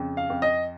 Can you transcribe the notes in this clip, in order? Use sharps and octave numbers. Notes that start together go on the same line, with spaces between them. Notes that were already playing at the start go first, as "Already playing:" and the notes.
Already playing: F2 C#3
F5
F2
D#5